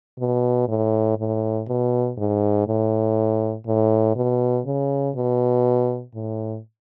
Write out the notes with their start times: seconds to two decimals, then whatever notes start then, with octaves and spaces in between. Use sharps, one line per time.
0.19 B2
0.68 A2
1.18 A2
1.68 B2
2.17 G#2
2.67 A2
3.67 A2
4.16 B2
4.66 C#3
5.15 B2
6.14 A2